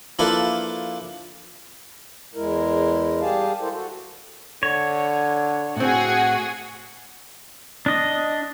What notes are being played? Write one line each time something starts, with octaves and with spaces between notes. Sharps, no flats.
F3 A#3 D4 E4 A4 B4
E2 G#3 E4 A#4
G3 G4 G#4 F5 A5
E4 A4 A#4 C5
F#4 A4
D3 C#5
A2 C4 F#4 G#4
D4 D#5